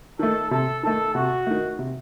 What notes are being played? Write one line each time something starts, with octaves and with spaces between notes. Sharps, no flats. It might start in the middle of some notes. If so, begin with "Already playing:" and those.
D#3 A3 A4
C3 A4
D#3 A3 A4
C3 F#4
D#3 A3
C3